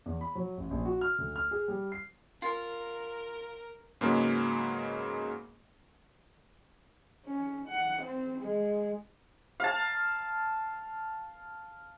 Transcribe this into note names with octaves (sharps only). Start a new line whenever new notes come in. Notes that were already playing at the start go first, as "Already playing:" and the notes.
E2
B5
F#3
A1
A#1
F#4
F6
D2
F6
G#4
G3
C7
F4 A#4
G#2 C#3 F#3 G#3 A#3 B3
C#4
F#5
C4
G#3
F5 A5